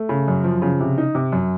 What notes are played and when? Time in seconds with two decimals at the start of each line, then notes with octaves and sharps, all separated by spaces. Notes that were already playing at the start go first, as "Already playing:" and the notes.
Already playing: A3
0.09 C#3
0.28 F#2
0.44 F3
0.62 C#3
0.80 C3
0.98 D#4
1.15 C3
1.32 F#2